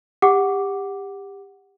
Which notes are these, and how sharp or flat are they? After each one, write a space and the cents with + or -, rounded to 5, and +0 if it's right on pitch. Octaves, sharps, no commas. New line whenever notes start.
G4 +25 F#5 +0 D6 +0